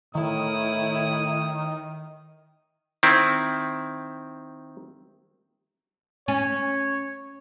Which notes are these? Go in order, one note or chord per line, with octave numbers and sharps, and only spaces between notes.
A2 D#3 E4 D#6
D#3 C4 E4
C#4 C#5